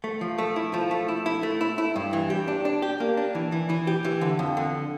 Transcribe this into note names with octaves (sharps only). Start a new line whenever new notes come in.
A3
F3
A3
E4
F3
A3
E4
E4
A3
E4
E4
G2
E3
G4
D4
D4
G4
A#3
D4
E3
E3
E3
G4
E3
D3
F2
D3